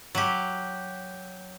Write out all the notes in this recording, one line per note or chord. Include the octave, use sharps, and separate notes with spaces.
F#3 G4